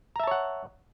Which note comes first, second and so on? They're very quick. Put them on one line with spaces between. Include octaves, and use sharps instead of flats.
A#5 E5 A5 C#5 F#5